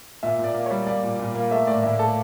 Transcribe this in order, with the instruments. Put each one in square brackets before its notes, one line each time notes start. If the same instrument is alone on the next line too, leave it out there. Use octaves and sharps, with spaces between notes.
[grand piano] A#2 E5
A#2
D5
A#3
G3 C#5
A#3 D5
A#2
A#2
A#3
A3 E5
A2 D5
A2 E5
A2 A4